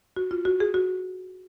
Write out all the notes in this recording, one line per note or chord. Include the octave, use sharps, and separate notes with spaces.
F#4
F4
F#4
G#4
F#4